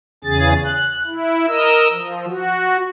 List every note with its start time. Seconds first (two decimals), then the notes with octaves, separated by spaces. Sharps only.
0.24 E2 C#3 G#4 A6
0.64 F#6
1.07 E4
1.48 A#4 D#5 E6
1.92 F3
2.28 F#4